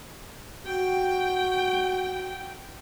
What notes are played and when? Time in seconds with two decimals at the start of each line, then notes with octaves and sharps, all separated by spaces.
0.66 F#4 G5